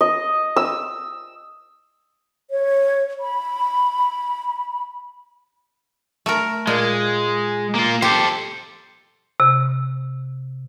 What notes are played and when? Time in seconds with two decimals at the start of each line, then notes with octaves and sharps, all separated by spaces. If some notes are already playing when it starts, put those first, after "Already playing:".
0.01 D#5
0.56 E6
2.51 C#5
3.20 B5
6.26 A3 A#4
6.67 A#2 G#3
7.75 A#3 F4
8.02 G4 A4 C5
9.40 C3